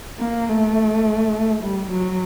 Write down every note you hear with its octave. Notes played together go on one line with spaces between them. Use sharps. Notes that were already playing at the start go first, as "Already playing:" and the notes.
A#3
A3
G3
F#3